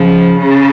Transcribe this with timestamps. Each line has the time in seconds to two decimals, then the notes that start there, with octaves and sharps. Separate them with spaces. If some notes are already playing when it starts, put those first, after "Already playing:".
Already playing: C#3 F3
0.40 C#3